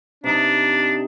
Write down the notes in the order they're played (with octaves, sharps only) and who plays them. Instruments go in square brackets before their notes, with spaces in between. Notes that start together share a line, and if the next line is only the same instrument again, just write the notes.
[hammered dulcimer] C3 D#4 [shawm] D4